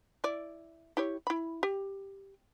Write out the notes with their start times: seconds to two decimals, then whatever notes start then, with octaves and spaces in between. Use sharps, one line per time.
0.24 E4 D5
0.97 E4 G4 C#5
1.27 E4 B5
1.63 G4